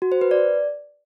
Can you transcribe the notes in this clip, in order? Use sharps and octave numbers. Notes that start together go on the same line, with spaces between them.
F#4
C5
B4
D5